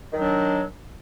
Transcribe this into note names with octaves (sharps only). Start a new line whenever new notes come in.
D#3 F#3 D4